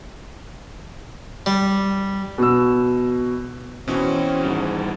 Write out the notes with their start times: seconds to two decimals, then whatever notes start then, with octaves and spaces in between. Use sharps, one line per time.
1.46 G3
2.38 B2 E6
3.88 B2 E3 C4 C#4 F#4 C#5
4.44 G#2 D#3 G3